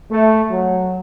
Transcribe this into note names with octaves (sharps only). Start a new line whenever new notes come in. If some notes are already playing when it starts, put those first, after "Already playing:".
A3
F#3